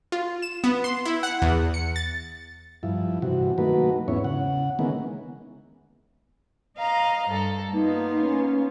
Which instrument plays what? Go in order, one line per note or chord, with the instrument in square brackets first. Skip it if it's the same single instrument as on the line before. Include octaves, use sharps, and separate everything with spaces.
[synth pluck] F4
E7
B3
C6
E4
F#5
E2
C#7
A6
[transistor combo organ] G2 F3 E4
G2 C3 E3 F#4
D#3 F#3 A3 A#3 F#4 B4
E2 G#2 B3 C#4 E4 C#5
C#3 F#5
D#3 E3 G#3 A#3 B3 C#4
[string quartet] D#5 F5 A#5
G2 A4
[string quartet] A#3 B3 F4 [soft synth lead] D#4
[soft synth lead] C#4